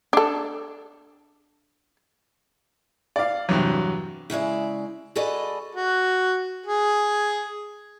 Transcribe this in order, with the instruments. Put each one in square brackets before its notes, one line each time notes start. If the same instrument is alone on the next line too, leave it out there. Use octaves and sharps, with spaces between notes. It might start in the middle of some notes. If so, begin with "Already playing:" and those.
[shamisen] D4 A4
[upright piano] D5 [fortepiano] F5 D6
[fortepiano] E2 G2 C3 [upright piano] F#3
[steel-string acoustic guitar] C#3 G#3 E4 D5
F#4 G#4 A4 B4 D5 D#5
[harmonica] F#4
G#4